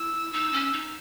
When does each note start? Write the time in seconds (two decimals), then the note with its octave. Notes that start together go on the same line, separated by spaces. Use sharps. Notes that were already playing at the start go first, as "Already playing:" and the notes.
Already playing: E4 E6
0.33 D#4 E6
0.53 C#4
0.73 D#4